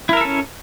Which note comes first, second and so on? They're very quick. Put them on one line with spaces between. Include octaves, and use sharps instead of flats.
E4 A#4 E5 A4 C#4